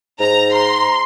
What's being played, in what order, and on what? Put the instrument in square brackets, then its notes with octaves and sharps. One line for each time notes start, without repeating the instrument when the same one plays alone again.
[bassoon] G#2 [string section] A#5
[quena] A#5 [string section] C6